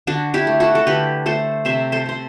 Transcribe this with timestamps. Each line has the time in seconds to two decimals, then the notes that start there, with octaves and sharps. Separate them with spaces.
0.07 D3 D4 F#4
0.34 E4 G4
0.47 A3
0.60 F#4 A4
0.75 A4
0.87 D3 G4 B4
1.26 A3 A4 C5
1.65 C3 C5 E5
1.92 A4 C5
2.06 C3 C5